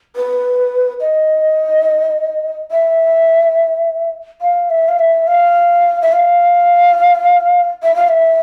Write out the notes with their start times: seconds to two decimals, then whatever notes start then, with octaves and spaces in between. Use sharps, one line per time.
0.16 B4
1.00 D#5
2.71 E5
4.41 F5
4.70 E5
4.88 F5
4.99 E5
5.27 F5
6.02 E5
6.12 F5
7.83 E5
7.95 F5
8.08 E5